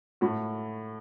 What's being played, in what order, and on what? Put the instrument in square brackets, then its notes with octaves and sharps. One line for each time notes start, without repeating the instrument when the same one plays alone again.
[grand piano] A2 F#4